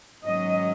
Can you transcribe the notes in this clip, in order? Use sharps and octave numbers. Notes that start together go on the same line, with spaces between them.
G#2 D#3 F#3 C#4 D#5